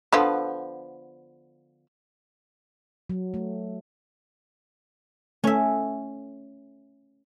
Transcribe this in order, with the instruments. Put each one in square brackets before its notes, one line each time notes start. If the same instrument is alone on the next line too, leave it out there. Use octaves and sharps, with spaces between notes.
[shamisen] D3 F3 B3
[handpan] F#3
A3
[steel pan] A3 [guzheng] C#4 E5